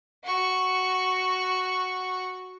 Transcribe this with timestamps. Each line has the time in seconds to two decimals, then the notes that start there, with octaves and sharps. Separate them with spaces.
0.24 F#4 C#6